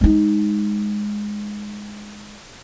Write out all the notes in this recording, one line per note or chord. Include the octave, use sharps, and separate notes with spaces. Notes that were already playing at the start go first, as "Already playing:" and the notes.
G#3 D#4